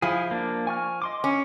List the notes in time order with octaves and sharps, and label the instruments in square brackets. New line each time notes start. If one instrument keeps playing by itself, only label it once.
[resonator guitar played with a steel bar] F3 [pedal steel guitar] E4 G#4
[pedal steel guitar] A#3 D4
G#5 C#6 F6
D#5 C6 D6
[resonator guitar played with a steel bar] C#4